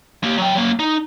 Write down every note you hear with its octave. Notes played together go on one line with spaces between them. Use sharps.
A#3 G4
F#3 G5
F#3 A#3
D#4